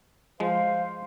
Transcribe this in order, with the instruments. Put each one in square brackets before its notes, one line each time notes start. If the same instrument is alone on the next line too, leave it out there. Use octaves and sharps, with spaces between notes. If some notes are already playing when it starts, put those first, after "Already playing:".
[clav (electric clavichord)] F3 G#3 [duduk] C5 [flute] F5